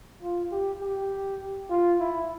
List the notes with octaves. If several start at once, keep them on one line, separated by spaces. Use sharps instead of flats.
F4
G4
G4
F4
E4